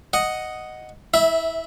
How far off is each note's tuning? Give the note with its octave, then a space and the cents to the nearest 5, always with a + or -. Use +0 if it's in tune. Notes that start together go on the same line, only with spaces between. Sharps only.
D#5 +0 F#5 +0
E4 -25 E5 +0